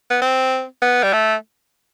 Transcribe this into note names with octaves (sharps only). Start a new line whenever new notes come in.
B3
C4
B3
G3
A3